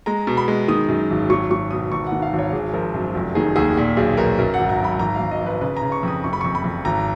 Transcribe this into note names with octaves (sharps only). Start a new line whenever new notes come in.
G#3 A#5
B2
B5
G#3
D#3 D#6
F#2
G#1
F#3 C#6
F#3 C#6
B2 D#6
G#1 C#6
F#5
D#3
F5
G#1
C#5
G#1 G#4
F3 A#4
F#2
F1
D#3 G#4
D#2 G#4
A#2
B1 G#4
B1 A#4
F#2 A#4
F#5
G#1
A#5
F#2 B5
G#1 A#5
G#1 F5
D#5
F3
B4
C#3 B4
A#5
C#3
C#6
F2 D#6
F#1 C#6
B5
F2 C#6
B5
F2
G#1 A#5